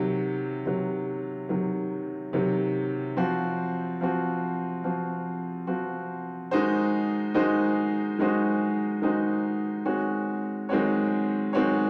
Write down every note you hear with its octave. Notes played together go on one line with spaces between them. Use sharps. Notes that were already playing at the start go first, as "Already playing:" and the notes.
Already playing: C3 D#3 F#3
C3 D#3 F#3
C3 D#3 F#3
C3 D#3 F#3
F3 C4 F#4
F3 C4 F#4
F3 C4 F#4
F3 C4 F#4
D#3 G#3 D#4 F#4 C5
D#3 G#3 D#4 F#4 C5
D#3 G#3 D#4 F#4 C5
D#3 G#3 D#4 F#4 C5
D#3 G#3 C4 F#4 C#5
D#3 G#3 C4 F#4 C#5
D#3 G#3 C4 F#4 C#5